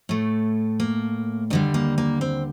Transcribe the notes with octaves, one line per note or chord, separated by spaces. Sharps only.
A2 A3
A#3
D#2 D3 G3 D4
A#3
A#3
C4